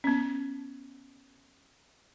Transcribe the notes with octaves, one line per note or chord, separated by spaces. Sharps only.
B3 C#4